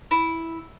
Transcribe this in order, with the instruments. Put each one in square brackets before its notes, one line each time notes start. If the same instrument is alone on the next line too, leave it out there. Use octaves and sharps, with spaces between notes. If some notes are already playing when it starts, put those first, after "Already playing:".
[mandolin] E4